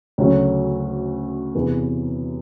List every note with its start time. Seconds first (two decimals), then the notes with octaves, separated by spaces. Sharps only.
0.18 D2 C#3 F#3 A3 C#4
1.55 E2 C3 E3